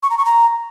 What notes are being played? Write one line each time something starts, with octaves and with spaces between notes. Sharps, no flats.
C#6
A#5
C#6
A#5